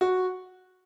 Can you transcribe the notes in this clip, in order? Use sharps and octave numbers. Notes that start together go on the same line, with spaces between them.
F#4